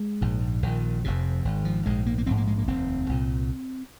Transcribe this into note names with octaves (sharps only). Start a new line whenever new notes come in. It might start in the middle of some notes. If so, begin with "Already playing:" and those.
Already playing: G#3
A#1 G#2
A#1 A#2 D#3
F1 F2 C3
G#1 G#2
F3
A#1 G#2 G#3
A#3
A#3
A#1 G#2 C4
A#3
G#3
A#3
F1 D#2 C4
C2 A#2